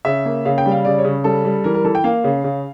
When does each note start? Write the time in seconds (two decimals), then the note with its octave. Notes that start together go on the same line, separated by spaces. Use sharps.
0.05 C#3 E5
0.26 A#3
0.45 C#3 F5
0.58 G5
0.66 G3
0.71 F5
0.85 C#3 D5
0.99 C#5
1.04 C#3
1.24 G3 A4
1.45 G3
1.64 E3 A#4
1.74 A#4
1.84 E3 A4
1.95 G5
2.04 A#3 F5
2.24 C#3
2.44 C#3